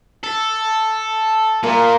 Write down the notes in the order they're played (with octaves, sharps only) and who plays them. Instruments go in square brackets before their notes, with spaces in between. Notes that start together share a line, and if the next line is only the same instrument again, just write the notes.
[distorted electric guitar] A4
[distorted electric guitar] A#2 [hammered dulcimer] A#3